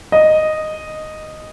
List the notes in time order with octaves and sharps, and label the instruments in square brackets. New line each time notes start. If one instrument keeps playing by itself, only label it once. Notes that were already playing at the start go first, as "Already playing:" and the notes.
[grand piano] D#5